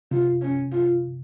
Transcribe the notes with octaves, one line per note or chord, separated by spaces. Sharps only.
C3 F4
C#4
F4